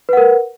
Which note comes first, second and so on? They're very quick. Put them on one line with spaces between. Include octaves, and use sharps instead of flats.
B4 F#5 A#4